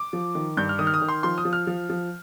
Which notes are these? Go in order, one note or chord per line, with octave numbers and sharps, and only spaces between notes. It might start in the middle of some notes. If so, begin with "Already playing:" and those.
Already playing: D6
F3
D#3
G2 G6
F6
D#3 D#6
F6
D#6
D#3
C6
F3 C6
D#6
F3
F6
F3
F3